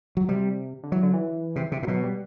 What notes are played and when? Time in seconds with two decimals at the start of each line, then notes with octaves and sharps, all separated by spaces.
0.17 F#3
0.29 C3 G3
0.83 D3
0.92 E3 F#3
1.03 D3
1.13 E3
1.56 C3
1.72 C3
1.83 A2
1.87 B2 F#3
2.04 G3